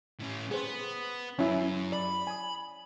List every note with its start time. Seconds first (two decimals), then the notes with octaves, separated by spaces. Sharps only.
0.20 A2 C#4
0.51 B3 G#4 C5
1.39 F#2 C#4 E4
1.92 D5 B5
2.27 G#5 D#6